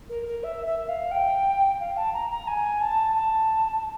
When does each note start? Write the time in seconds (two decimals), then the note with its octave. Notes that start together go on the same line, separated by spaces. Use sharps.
0.09 A#4
0.26 A#4
0.43 E5
0.66 E5
0.88 F5
1.11 G5
1.79 F5
1.96 A5
2.13 A#5
2.30 A#5
2.47 G#5
2.81 A5
3.15 A5
3.71 A5